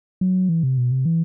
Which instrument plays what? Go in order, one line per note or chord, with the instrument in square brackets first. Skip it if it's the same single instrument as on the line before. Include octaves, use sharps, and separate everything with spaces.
[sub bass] F#3
E3
C3
B2
C3
E3